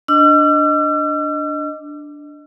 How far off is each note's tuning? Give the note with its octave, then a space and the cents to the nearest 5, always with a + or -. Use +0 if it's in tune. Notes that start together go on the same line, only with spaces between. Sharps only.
D4 +0 D#5 +0 E6 +45